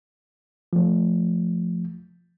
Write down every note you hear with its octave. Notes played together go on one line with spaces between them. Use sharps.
F3 A3